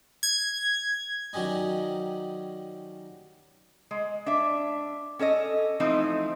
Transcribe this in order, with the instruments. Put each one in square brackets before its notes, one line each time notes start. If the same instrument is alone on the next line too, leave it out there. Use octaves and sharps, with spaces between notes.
[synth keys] G#6
[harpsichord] D#3 F#3 G3 C#4 D#4
[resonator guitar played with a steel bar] G#3
D4 E5
C#4 A4 C#5 D#5
E3 F3 A3 C4 D#4